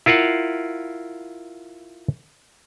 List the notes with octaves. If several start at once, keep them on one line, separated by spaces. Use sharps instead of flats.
E4 F4 A#4 F5 F#5